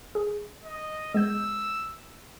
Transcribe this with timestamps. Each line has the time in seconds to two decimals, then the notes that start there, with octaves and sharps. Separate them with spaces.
0.15 G#4
0.64 D#5
1.14 G#3 B3 E6 G6